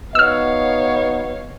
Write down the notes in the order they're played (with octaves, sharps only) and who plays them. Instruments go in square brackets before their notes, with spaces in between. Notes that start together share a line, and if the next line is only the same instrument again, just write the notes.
[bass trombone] B3 [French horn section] D#4 F#4 D#5 [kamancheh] C#5 F5 [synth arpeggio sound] E6 F6